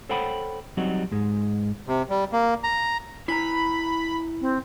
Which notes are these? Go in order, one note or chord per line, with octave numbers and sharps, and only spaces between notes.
A4 C5 C#5 F#5 G5 B5
F#3 G3 C4 D#4 F#4
G#2 G#3
C3
G3
A#3
A#5
E4 G#5 A#5 B5
C4